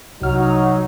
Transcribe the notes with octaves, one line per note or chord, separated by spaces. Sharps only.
C2 F#3 D#4 F6